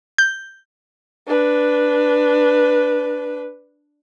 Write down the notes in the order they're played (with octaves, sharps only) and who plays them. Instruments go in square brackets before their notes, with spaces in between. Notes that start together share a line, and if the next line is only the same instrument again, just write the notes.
[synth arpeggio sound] G6
[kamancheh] D4 B4